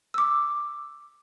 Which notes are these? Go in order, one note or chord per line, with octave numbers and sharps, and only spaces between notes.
D6 E6